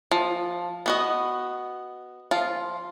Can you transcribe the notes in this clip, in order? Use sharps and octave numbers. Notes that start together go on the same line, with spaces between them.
F3
B3 F#4 D#5
F3 F4